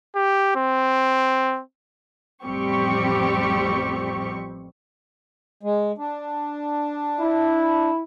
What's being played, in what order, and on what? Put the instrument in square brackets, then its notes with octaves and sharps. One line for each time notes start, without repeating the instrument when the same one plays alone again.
[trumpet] G4
C4
[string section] A1 F2 G3 C4 G4 C#6
[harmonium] G#3
D4
[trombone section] E4